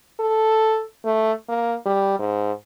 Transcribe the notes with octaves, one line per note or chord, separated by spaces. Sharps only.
A4
A3
A#3
G3
G#2